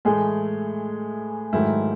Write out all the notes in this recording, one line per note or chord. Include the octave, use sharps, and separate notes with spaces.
A2 E3 G#3 A3 G#4
G#2 D#3 F#3 A3 E4